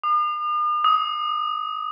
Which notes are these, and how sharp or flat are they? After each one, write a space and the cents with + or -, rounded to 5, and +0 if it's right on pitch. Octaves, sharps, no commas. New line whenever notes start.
D#6 -45
D#6 +25